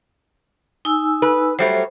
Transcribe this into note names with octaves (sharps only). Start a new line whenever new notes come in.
D#4 G#5 E6
B4
F#3 G3 A3 C5